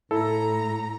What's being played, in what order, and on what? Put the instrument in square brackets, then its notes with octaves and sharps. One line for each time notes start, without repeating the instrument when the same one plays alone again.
[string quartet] A2 A#5 [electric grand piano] E4 A4